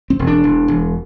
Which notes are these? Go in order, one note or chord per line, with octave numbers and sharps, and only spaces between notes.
C4
E1
D4
E1
E1